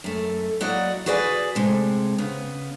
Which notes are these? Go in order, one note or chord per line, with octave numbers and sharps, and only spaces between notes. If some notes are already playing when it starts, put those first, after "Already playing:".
F#2 A3
F#3 A#3 E4 F#4 D5 D#5
F#4 G#4 B4 D5 E5 G#5
C3 G#3 A3
C#3 B3